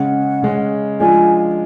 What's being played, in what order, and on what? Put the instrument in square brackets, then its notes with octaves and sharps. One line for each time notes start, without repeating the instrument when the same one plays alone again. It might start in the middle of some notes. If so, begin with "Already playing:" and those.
Already playing: [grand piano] C#3 G#3 C#4 [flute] F#5
[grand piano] C#3 G#3 C#4
[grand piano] F3 G#3 D4 F4 [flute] G#5